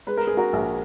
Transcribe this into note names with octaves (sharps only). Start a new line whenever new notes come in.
G#3 B4
A#4
G#3 G#4
F#4 A#4
A#1